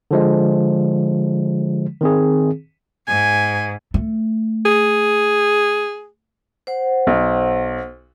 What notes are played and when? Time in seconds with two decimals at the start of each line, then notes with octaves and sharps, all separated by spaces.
0.11 D3 F3 G#3
2.01 D#3 C4 G#4
3.07 G#2 G#5
3.94 A3
4.65 G#4
6.67 C5 F#5
7.07 B1